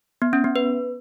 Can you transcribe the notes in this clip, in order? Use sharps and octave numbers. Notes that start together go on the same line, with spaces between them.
B3
C#4
B3
B4